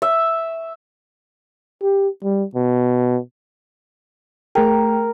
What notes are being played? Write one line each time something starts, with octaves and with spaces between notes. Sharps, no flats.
E5
G4
G3
B2
A3 G#4 A#4 G5